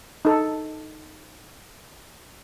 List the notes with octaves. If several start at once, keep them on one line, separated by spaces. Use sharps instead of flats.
D#4 A4